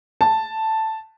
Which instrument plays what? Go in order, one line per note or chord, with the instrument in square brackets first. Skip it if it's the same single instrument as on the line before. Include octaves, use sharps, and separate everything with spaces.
[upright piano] A5